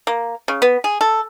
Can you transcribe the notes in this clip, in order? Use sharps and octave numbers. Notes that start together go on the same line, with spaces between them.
A#3
C#3
B3
G#4
A4